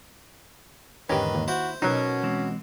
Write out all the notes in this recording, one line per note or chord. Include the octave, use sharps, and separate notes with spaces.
E2 G#2 D3 D#3 C#4 G4 B4
D#2
E4 F#4 C5
B2 F#3 C#4 D#4 A#4 C5
E3 G#3 C4